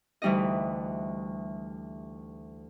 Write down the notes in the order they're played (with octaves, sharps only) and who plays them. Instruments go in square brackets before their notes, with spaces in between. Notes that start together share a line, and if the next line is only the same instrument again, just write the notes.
[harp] D2 E3 G3 D#4 D#5